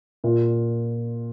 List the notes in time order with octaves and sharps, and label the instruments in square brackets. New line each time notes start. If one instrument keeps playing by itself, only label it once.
[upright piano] A#2